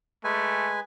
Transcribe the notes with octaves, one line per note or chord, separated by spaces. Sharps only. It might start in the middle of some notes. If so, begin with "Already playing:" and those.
G#3 A3 B4 G#5